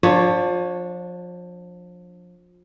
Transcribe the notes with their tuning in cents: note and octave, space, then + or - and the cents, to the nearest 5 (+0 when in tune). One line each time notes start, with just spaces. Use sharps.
F3 +30 D4 +0 C#5 +0